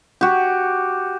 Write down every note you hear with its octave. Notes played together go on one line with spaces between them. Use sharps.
F#4 G4